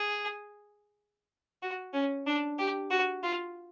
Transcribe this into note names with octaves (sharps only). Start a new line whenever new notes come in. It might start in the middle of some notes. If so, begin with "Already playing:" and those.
Already playing: G#4
F#4
C#4
D4
G4
F#4
F4